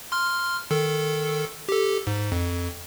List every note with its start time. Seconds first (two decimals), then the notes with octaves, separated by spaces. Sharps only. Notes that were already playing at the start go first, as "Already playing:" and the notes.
0.12 C6 F6
0.71 D#3 A4
1.69 G4 A4
2.07 G#2
2.32 F2